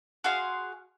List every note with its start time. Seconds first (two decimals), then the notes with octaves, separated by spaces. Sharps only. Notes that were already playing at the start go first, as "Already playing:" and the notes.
0.24 F#4 G#4 F5 C6